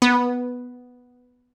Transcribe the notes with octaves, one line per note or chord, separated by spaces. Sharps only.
B3